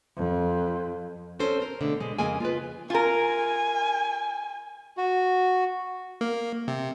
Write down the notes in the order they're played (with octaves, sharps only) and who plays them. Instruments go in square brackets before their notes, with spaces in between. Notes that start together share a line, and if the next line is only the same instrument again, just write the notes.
[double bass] F2
[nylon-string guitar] C4 C#4 A4 C5
A#4 C5
B2 D3 A3
B2 G#3
F2 C#3 G#3 A#3 G#5
F4 B4
[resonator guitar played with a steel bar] F4 A#4 [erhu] G#5
[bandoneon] F#4
[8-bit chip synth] A#3
C3